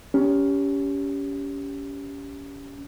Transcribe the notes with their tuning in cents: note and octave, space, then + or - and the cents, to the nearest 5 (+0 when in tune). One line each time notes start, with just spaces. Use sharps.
C#4 +25 G4 +0